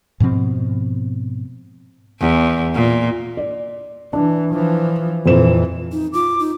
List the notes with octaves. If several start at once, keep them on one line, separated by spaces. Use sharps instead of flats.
G#2 B2 F3 C4
E2
A#2
D5
E3 D4
E3 F3
F2 A#2 E3 C5 E7
D#4
F4 D6
D#4